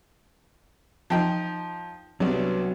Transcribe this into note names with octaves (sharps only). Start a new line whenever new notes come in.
F3 D#4 G5
C2 F#3 B3 D4